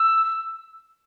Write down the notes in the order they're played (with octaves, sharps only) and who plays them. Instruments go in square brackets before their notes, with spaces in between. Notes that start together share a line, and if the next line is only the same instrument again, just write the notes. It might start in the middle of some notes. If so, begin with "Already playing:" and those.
Already playing: [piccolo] E6